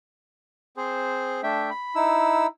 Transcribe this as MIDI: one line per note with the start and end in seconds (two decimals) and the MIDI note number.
0.77 1.41 60
0.77 1.41 68
0.77 1.41 72
1.43 1.70 57
1.43 1.70 62
1.43 1.70 76
1.43 1.70 79
1.70 1.95 83
1.95 2.47 63
1.95 2.47 64
1.95 2.47 88